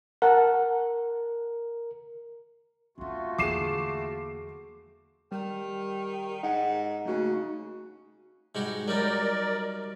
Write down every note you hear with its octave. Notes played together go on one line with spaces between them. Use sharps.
A#4 F#5 A5
A3 C4 C#4 F4 F#4
E2 D3 A#3 G#4 D6 C7 E7
D#3 G3
G#2 D#4 F#5
C#3 A3 A#3 F#4
G#2 G3 F#4
F#3 G3 D#4 A#4 D5